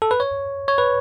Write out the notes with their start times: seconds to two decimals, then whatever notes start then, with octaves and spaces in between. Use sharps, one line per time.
0.02 A4
0.11 B4
0.20 C#5
0.68 C#5
0.78 B4